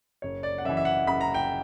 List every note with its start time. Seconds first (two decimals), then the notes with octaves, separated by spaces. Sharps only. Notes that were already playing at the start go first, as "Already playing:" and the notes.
0.22 F#1 C#5
0.43 D5
0.58 F#5
0.65 F#2 E5
0.69 E3
0.77 E5
0.85 F#5
1.07 F#1 B5
1.21 A#5
1.34 G5